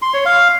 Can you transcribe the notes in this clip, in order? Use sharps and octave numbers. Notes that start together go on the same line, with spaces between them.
C6
C#5
F5